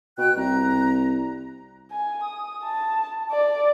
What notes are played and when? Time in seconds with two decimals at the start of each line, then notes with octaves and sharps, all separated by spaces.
0.18 B2 G5 F#6
0.36 C2 A#5
1.91 G#5
2.23 D#6
2.64 A5
3.31 D5